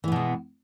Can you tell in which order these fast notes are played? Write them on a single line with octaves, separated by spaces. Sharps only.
E3 B3 B2 G#3